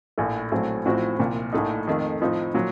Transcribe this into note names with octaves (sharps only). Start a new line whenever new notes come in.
A#1 A2 A3
A#1 A2 F#3 A3 C4
A1 A2 F3 C4 F#4
C2 A#2 F3
A#1 A2 A3 D#4
F2 D#3 A3
A2 F3 C4 D#4
A#2 F#3